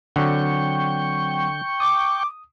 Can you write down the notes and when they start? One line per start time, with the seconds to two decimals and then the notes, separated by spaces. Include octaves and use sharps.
0.16 D3 F#3 C4 F#5 G5 C#6
1.80 D6 D#6